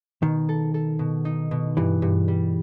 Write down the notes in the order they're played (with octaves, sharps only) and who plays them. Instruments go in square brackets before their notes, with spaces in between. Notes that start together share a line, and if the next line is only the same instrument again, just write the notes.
[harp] B2 [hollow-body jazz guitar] D#3
[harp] A4
A4
B2
D#4
B2
[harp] G2 [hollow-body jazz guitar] E3
[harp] G2
G3